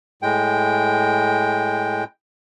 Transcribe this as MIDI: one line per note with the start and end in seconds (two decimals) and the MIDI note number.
0.22 2.04 45
0.22 2.04 56
0.22 2.04 79